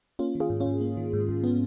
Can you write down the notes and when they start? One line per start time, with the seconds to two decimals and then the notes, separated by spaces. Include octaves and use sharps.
0.19 A#3 C#4 F4
0.35 D#3
0.40 F4 G#4
0.50 G#2
0.60 C#4 F4
0.66 G#2
0.81 A#3
0.97 D#3
1.13 G#2
1.29 G#2
1.44 B3